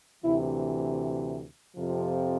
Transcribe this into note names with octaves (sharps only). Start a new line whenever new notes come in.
D2 C3 E3 E4
F2 C3 F3